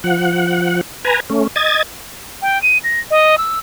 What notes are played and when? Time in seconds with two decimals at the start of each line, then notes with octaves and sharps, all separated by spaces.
0.04 F3 F#5
1.05 B4 G#5 A#5
1.30 A3 C#4
1.56 D#5 G#6 A6
2.42 G5
2.62 D#7
2.84 A#6
3.10 D#5
3.38 E6